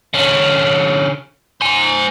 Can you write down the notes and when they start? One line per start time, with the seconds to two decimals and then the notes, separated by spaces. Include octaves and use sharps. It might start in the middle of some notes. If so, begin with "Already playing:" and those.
0.14 D3 C#4
1.61 C5 G#5